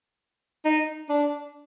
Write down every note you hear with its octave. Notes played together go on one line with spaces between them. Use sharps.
D#4
D4